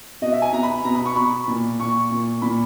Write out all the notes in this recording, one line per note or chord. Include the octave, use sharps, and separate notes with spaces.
B2 D#5
E5
G#5
B2 A#5
B5
B2 A#5
B5
C#6
B2 B5
A#2
A#2 C#6
A#2
A#2 B5